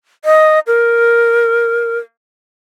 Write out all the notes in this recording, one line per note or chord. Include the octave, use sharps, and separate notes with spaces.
D#5
A#4